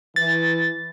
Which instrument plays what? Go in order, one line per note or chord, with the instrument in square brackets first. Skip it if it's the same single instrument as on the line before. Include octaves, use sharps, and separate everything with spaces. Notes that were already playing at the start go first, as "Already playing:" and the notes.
[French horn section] E3 [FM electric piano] A6